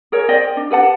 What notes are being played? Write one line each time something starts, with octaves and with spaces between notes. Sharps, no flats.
G#4 A#4 C#5
C5 D5 D#5 G5
D4
G4 B4 F#5 A5